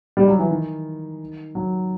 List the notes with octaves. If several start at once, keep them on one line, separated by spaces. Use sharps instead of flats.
G3
F#3
E3
D#3
F#3